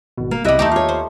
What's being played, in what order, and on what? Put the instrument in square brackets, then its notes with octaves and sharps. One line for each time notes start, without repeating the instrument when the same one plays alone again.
[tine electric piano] G#1 B2
[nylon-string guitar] A#3
[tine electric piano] C2 C3 F#6 [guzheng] G3 E5 [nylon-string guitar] E4 D#5
[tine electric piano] D#2 [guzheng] A3 D#4 G4
[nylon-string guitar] F4 C#5
[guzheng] C5